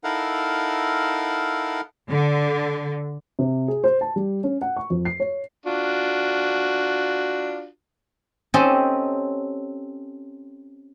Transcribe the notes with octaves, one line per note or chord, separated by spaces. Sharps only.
D#4 E4 A4 A#4 F5 F#5
D3
C3
G#4
C5
A5
G3
C#4
F#5
C#6
F2
C7
C#5
D4 F4 F#4
C4 C#4 G4 A4 C5 D#5